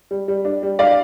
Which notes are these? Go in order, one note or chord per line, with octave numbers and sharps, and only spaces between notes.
G3
G3
D4
G3
D4 D5 F5